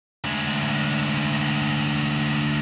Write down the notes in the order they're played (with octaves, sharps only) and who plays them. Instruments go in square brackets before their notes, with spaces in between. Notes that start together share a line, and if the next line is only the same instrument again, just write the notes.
[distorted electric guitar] D2 G#3